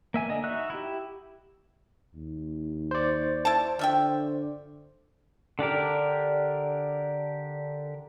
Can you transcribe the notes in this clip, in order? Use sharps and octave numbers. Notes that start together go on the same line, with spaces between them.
A#3 E5 G#5
D3 D#5
D#4 F#4 E5 E6 F#6
E4 G4
D#2
C5 D5
E4 A5
D3 F3 E5 G5
D3 D4 G4 A#4